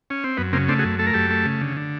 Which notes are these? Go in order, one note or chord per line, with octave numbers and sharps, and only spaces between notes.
C#4
C4
F#2 B3
C#3 A#3 C4
A3 C4 D4
F#4 G#4
F#2
A3 A4
A#4
F#2 G4 A4
A3
C#3
D3
D3